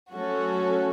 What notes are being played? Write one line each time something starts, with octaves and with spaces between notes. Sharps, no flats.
F#3 A3 C#4 F#4 A4